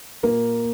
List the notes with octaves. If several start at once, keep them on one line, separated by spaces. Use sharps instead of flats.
A#2 A#3 A#4